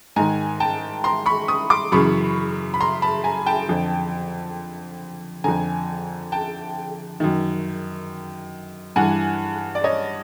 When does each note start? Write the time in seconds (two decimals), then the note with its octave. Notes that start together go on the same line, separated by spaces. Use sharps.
0.16 G#2 D#3 G#5 A#5
0.60 G5 A5
1.04 A#5 C6
1.26 B5 C#6
1.48 C#6 D#6
1.70 C6 D6
1.92 F#2 C#3 E3 B5 C#6
2.74 B5
2.80 A#5 C6
3.02 A5 B5
3.24 G#5 A#5
3.46 G5 A5
3.68 F2 D3
5.44 F2 D3 G#5 A#5
6.32 G5 A5
7.20 F#2 D#3
8.96 G2 E3 F#5 G#5
9.75 D5
9.84 C#5 D#5